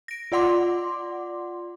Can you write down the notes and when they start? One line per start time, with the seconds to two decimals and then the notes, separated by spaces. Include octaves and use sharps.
0.08 A#6 D7
0.32 F4 D5 F#5 C6 D6